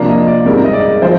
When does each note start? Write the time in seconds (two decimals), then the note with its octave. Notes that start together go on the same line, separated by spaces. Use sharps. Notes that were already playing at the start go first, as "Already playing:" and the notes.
Already playing: C3 F3 A#3 D4
0.09 D#5
0.27 D5
0.45 G#2 G3 C4 A#4
0.64 D#5
0.73 D5
1.02 F3 C5